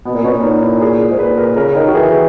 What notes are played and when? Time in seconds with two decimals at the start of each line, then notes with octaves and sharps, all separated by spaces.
0.05 B2 B3
0.15 A#2
0.24 B2 C#4
0.33 A#2
0.43 D#4
0.62 E4
0.81 G#4
1.00 A#4
1.11 G#2
1.18 A#2 B4
1.37 A#4
1.56 C#3 A#4
1.75 D#3 A#4
1.88 F#4
1.94 E3 G#4